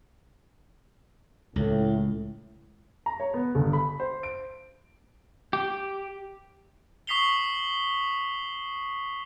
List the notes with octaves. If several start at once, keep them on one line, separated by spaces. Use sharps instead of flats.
C#2 A2
A#5
C#5
B3
G1
B5
C5
D7
G4
C#6 D#6 B6 C7 F7 G7